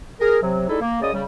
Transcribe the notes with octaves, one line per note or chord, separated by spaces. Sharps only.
G#4 A#4
C3 F#3
G3 G#3 D#4 E4 A4
A#3
F#2 C#3 G#4 D5 D#5 D#6
C#3 G3